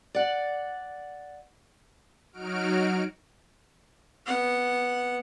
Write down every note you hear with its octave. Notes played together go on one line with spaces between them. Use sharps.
D5 F#5
F#3 D#4 F#4 F6 D7
B3 F#5